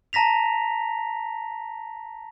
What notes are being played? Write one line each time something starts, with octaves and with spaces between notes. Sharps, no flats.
A5 A#5 A#6 B6 F7